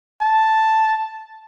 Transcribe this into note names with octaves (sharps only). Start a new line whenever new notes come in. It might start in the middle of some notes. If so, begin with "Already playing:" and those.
A5